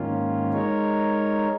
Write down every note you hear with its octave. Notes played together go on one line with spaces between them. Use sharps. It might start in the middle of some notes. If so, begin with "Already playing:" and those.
Already playing: G#2 D#3 A#3 C#4 F4
G#3 D#4 A#4 C#5